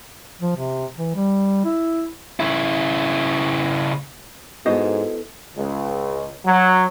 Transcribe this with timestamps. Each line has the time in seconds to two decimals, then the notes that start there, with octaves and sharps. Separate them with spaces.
0.41 F3
0.56 C3
0.97 E3
1.16 G3
1.65 E4
2.40 C#3 E4
4.66 G#2 B3 E4 F#4 A4 C5 D#5
5.57 C#2
6.46 F#3